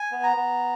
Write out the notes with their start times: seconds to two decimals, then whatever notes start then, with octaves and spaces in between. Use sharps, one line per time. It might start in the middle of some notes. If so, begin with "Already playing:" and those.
Already playing: G#5
0.12 B3
0.23 A#5
0.36 B3